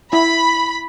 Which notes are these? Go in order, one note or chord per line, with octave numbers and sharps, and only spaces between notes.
E4 B5